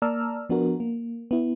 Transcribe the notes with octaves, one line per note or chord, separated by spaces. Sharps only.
A#3 D5 A5 A#5 E6 F6
F3 B3 D4 F#4 A#4
A#3
B3 E4